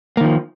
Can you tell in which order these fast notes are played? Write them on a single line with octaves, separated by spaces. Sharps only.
A#3 D#3 F3